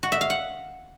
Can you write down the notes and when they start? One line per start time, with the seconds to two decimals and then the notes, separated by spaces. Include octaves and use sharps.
0.03 F#4
0.12 E5
0.21 F5
0.30 F#5